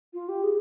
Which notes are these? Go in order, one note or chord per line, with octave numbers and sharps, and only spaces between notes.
F4
G4
G#4